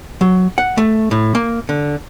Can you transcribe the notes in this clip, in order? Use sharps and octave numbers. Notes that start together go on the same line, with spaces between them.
F#3
F#5
A3
A2
A#3
D3